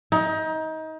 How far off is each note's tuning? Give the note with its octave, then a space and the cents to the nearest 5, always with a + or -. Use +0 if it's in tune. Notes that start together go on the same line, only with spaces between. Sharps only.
D#4 +25